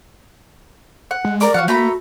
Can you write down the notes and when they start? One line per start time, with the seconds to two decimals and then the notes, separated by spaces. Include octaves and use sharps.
1.11 F#5
1.25 G#3
1.41 A#4 D5 D6
1.54 F3 F#4 F5 F#5
1.68 A3 A#3 F#4 A#5 B5